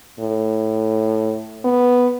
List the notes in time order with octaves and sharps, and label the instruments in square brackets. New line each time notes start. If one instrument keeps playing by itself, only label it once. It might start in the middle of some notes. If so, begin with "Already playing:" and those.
[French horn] A2
B3